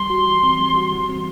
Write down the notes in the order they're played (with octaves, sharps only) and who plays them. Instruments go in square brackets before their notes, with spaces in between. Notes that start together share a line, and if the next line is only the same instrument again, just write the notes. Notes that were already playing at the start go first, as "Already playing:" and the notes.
Already playing: [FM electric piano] G3 [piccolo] C6
[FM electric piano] F#4
E3
C4
G3
F#4
E3
C4